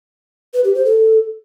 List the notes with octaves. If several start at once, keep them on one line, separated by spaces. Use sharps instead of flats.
B4
G4
C5
A4